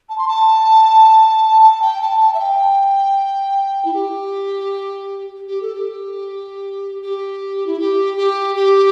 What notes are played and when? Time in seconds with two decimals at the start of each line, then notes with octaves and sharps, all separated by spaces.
0.09 A5
0.18 C6
0.28 A5
1.62 A5
1.82 G5
2.01 A5
2.20 A5
2.34 E5
2.39 G5
3.85 E4
3.94 G4
5.48 G4
5.62 A4
5.75 G4
7.02 G4
7.66 E4
7.79 G4
8.17 G4
8.56 G4